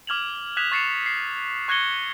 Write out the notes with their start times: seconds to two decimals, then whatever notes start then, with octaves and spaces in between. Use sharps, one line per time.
0.07 D6 F6 G#6 F7 F#7
0.57 D#6 F#6 G#6 B6 E7 F7
0.72 C#6 A6 C7 C#7 E7 F7
1.06 C7
1.68 C#6 F#6 G#6 A#6 C#7 G7